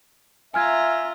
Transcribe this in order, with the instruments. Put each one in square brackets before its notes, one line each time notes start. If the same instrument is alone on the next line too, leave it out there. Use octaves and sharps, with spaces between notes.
[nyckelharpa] F4 A#5 [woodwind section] E5 [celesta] G#5 F6 G#6